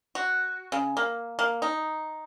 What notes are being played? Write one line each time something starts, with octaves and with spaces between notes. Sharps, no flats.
F#4
C#3
A#3
A#3
D#4